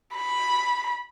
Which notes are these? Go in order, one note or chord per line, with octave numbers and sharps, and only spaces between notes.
B5